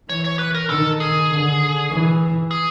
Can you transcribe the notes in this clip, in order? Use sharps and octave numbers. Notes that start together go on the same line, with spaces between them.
E3 C#5
C#5
B4
A#4
D#3 A4
G#4
D3
E3
G#4